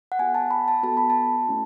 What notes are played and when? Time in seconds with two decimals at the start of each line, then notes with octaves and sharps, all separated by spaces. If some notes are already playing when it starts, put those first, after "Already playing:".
0.12 F#5
0.19 B3 F#4 A4 G#5
0.35 A5
0.51 B5
0.68 A5
0.83 B3 F#4 A4 A5
0.97 B5
1.10 A5
1.48 A3 C#4 E4